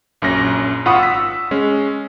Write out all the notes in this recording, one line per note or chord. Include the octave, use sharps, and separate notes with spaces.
A#1 F#2 C#4 A#6
G#1 F4 F#5 B5 C#6 D#6
E6 B6
G#3 C#4